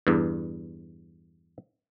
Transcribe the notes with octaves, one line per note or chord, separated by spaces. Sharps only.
E2 G2